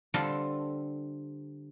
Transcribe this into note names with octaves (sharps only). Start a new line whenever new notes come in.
D3 G3 C4 F4 A4